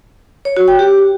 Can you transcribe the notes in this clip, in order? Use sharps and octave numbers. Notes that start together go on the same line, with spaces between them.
C#5
F#4
G5
G4